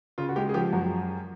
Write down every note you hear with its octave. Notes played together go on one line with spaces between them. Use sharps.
C#3 F4
F#4
G#3 G4
G#4
F3 G4
F#2 F#4